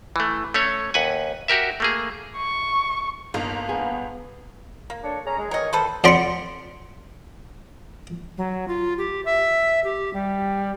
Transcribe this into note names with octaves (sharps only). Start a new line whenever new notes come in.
E3 A3
A3 C#4 C#5
D#2 B4 F#5 G#5
F#4 G4 A#4 E5
A3 A#3 G#4
C#6
G1 A#3 D#4
B3 G#4
A#3
D4 A4 C#5
C#4 G#4 A#5
G#3 G#4
D#3 E3 A#4 C#5 D#5
D#3 A4 B4 C5
F2 D5 F#5 B5 C6 C#7
F#3
F4
G4
E5
G4
G3